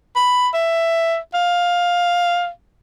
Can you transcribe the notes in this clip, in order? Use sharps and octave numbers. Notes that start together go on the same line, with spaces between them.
B5
E5
F5